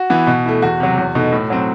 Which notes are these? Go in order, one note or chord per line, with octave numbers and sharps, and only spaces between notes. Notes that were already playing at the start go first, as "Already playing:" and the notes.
Already playing: F#4
E3 B3 E4
B2
A3 E4
E2 F#4
C3 F#3
E2
B2 A3 D#4
A2
F#3 C4